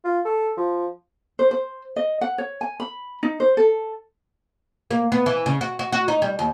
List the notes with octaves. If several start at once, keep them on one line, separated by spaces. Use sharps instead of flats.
F4
A4
F3
C5
C5
D#5
F#5
C#5
G#5
B5
D#4
C5
A4
A#3
B3
E3
C#3
F#4
F#4
F#4
D#4
G3
D#2